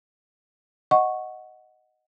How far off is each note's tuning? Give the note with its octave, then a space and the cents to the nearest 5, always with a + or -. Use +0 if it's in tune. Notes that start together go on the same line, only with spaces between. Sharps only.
D#5 +0 F#5 +0 C#6 -5